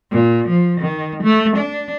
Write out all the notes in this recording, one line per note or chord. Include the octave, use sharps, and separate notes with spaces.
A#2
F3
D#3
A3
D4